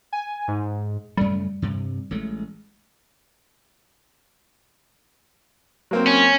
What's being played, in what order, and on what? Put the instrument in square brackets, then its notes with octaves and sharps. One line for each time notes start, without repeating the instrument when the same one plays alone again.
[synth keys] G#5
G#2
[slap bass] F#2 C#3 A3 [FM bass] G3
[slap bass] G2 C3
A1 G#3 A3
[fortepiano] F#3 A#3 C4
[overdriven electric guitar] C#4